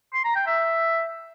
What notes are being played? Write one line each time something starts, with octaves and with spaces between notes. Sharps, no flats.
C6
A#5
G5
E5